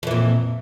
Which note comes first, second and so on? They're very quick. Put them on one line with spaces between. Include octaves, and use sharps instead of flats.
F2 E3 A#2